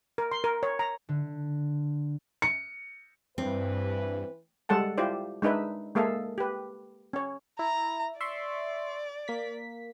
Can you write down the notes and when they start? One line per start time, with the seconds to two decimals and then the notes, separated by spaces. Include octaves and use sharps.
0.18 A#4
0.32 C6
0.44 A#4
0.63 C#5
0.79 A#5
1.09 D3
2.42 C#7
3.38 G2 E3 C4 B4
4.69 G3 G#3 A4 F#5 A5
4.98 E4 F4 G4 C5 D5
5.42 G#3 D4 D#4 B4 E5
5.95 G#3 A#3 G#4 A4 E5 F5
6.38 G4 B4
7.13 C#4 C#5
7.59 E4 A#5
8.21 D5 E5 C6 C#6
9.28 A#3 B6